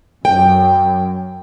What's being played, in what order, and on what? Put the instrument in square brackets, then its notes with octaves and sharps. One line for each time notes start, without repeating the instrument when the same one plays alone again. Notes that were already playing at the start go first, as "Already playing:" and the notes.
[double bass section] F#2 [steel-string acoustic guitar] G5